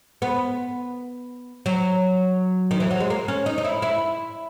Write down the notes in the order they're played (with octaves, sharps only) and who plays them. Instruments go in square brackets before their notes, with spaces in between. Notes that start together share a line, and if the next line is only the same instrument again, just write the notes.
[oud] B3
F#3
D#3
E3
F#3
G#3
A#3
C#4
D#4
D#4
E4
E4